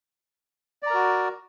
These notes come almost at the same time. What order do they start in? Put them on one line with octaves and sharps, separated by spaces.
D5 A#5 A#4 F#4